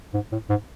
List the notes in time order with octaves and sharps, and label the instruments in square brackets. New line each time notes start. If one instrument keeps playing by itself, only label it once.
[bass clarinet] G#2
A2
G#2